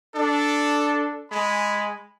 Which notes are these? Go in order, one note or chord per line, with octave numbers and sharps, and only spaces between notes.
D4 A4
G#3 G#5 B5